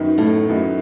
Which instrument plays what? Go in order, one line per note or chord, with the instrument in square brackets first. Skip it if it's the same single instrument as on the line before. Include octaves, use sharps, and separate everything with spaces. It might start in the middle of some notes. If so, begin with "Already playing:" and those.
Already playing: [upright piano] F#2 D#3 F#3 B3 D#4
[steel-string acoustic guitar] A2
[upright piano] F#2 D#3 F#3 B3 D#4